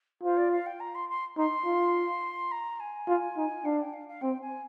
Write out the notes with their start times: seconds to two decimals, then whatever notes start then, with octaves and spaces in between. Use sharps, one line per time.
0.23 F4 C5
0.37 D5
0.51 F5
0.66 G5
0.80 A#5
0.95 C6
1.09 C6
1.37 D#4 C6
1.66 F4
2.51 A#5
2.80 G#5
3.08 F4
3.37 D#4
3.65 D4 F5
3.80 G5
3.93 F5
4.08 F5
4.22 C4 G5
4.41 G#5